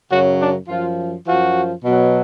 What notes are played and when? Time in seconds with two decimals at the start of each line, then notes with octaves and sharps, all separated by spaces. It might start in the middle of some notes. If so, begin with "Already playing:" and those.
0.10 F#2 C#3 F#3 F#4
0.39 D4
0.68 F#2 F3 F4
1.26 F#2 F3 F#4
1.84 B2 F#3